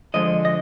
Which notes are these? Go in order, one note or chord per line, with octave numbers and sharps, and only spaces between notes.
D3 F3 G#3 D#5
D#5